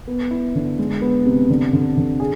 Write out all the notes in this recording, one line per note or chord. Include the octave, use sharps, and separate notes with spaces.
B3
E4
D3
G#3
B3
C3
D3
D3
D3
G#4